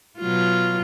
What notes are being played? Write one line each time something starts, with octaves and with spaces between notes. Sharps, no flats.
B2 F#3 F4